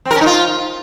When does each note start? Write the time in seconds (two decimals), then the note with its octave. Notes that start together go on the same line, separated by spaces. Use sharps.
0.05 C4
0.11 A#4
0.16 C#4
0.21 D#4
0.26 F4